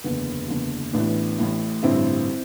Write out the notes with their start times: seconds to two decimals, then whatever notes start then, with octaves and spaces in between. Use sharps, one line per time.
0.04 F#1 E2 D3 B3
0.48 F#1 E2 D3
0.93 A1 A2 E3 B3 D4
1.39 A1 A2 E3
1.83 A1 G2 D3 C4 E4